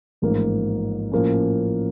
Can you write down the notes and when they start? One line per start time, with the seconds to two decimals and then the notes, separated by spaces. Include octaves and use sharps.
0.22 A1 G#2 F3 A#3 D#4
1.12 A2 F3 A#3 C#4